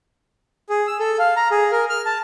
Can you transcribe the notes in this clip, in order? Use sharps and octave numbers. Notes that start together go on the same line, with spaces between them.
G#4
E6
A4
F5
A#5
G#4
A#4
F6
A5